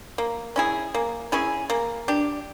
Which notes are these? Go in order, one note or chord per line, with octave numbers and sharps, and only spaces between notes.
A#3
C#4 E4 G#4
A#3
C#4 E4 G#4
A#3
D4 G4